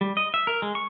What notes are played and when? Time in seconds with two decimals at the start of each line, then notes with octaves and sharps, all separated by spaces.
0.01 G3
0.17 D#5
0.34 E5
0.47 A#4
0.62 G#3
0.75 C#6